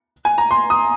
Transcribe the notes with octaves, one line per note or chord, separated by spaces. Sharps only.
G#5
A#5
C6
D#6